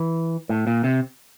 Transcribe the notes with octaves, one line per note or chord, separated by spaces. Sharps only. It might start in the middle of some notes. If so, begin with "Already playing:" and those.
Already playing: E3
A2
A#2
C3